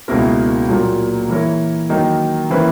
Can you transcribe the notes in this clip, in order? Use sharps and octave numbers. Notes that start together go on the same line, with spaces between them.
C#2 B2 A#3 E4 A#4
A#2 F#3 A#3
E3 A#3 E4 A#4 C#5
D#3 F#3 A#3 D#4
E3 A#3 C#4 E4 B4